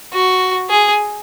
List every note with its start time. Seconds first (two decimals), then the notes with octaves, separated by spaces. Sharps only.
0.13 F#4
0.70 G#4